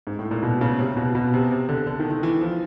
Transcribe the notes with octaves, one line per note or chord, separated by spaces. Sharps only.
G#2
A2
A#2
B2
C#3
C3
B2
B2
C3
C3
D3
D3
D#3
D#3
E3
F3